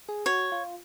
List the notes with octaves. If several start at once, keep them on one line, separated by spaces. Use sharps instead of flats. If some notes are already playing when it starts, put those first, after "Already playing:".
G#4
F#4 C#5
F4